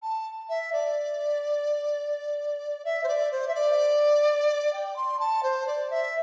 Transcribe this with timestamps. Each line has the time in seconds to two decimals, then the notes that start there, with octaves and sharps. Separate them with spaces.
0.02 A5
0.49 E5
0.72 D5
2.85 E5
3.03 C5
3.08 D5
3.31 C5
3.48 E5
3.54 D5
4.73 G5
4.96 C6
5.19 A5
5.43 C5
5.67 D5
5.90 E5